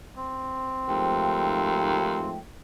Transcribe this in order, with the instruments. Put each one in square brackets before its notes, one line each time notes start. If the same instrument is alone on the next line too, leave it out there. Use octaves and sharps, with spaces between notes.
[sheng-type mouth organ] C4
[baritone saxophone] D#2 [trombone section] G#2 F3 A3 [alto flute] G5